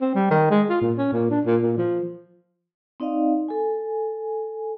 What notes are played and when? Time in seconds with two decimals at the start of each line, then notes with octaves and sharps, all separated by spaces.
0.01 C4
0.15 G3
0.31 D#3
0.51 G#3
0.69 F4
0.82 A#2
0.98 C#4
1.13 A#2
1.31 D4
1.46 A#2
1.62 A#2
1.78 F3
3.00 C4 D#4 D5 D#5 F5
3.48 A4 G#5